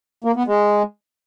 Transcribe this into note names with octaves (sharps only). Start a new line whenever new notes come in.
A#3
B3
G#3